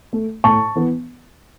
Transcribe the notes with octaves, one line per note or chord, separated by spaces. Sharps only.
A3
A2 A5 C#6
E3 B3